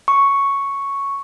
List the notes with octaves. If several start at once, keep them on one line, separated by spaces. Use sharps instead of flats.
C#6